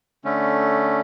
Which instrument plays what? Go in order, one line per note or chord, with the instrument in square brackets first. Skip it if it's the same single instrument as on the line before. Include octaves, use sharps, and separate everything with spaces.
[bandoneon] D3 A3 C#4